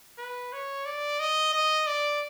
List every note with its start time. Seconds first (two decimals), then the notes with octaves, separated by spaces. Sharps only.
0.18 B4
0.53 C#5
0.86 D5
1.20 D#5
1.53 D#5
1.87 D5